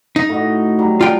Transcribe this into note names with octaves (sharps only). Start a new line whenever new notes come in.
D#4
A2 F#4 D#5
F#3 G3
D4 F4 G5